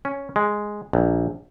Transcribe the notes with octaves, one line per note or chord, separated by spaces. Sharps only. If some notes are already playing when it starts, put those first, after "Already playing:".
C#4
G#3
A#1